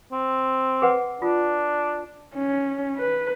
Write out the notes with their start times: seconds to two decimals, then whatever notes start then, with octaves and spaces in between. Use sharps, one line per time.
0.12 C4
0.82 G#4 B4 F#5
1.22 D4 F4
2.35 C#4
2.97 B4